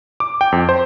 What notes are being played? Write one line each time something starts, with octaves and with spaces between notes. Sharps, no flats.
D6
G5
F2
C5